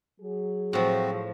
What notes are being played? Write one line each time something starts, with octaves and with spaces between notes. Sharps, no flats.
F#3 G#4
A2 F3 C4 F#4